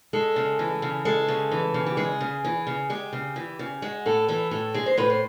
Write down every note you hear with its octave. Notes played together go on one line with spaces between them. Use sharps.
G#3 A4
C#3
E3
C#3
G#3 A4
C#3
E3
C#3
G4
G#3 G#4
C#3
E3
C#3
G#3 G4
C#3
E3
C#3
G#3 F#4
A2 A4
E3 A4
A2 A4
G#3 G#4
C5
A2 B4
C5